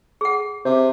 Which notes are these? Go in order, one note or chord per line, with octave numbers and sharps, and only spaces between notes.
G#4 F#5
C3 C5